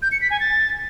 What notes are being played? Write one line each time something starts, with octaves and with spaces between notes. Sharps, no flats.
G6
C#7
B6
G#5
A6